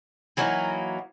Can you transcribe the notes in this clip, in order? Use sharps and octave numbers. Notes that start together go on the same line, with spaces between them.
E3 F#3 A#3 D#4